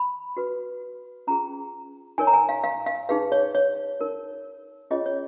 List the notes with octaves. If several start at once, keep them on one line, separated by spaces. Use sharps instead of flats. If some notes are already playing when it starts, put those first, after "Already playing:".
Already playing: B5
F#4 B4
C#4 F4 G#4 A#5
D#4 A#4 C#5 G#5
A#5
G#5
F5
F5
F5
D#4 G#4 B4 F5
C#5
C#5
D#4 A#4 C#5
C#4 F4 G#4 C#5 D#5
C#5